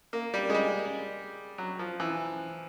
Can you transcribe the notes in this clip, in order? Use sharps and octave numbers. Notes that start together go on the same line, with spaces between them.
A#3
G3
G#3
G3
F#3
F3
E3